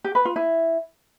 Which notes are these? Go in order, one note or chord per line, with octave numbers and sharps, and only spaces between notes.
G4
B4
F4
E4